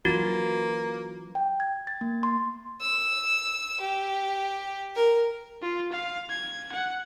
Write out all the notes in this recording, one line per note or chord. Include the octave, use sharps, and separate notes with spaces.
E3 F#3 A#3 C#4 F4 F#4
G5
G#6
A6
A#3
C6
E6
G4
A#4
F4
F5
G#6
F#5